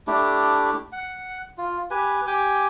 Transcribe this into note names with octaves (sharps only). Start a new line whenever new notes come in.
A3 D4 E4 G4
F#5
F4
G4 B4 G#5
G4 G5 G#5 D6